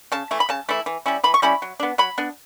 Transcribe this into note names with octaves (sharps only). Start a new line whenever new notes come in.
C#3 A5
E3 A3 E4
B5
C#3 A5
E3 A3 E4
E3
G3 C#4 E4
E3 B5
C#6
G3 C#4 E4 B5
F#3
B3 D4
F#3 B5
B3 D4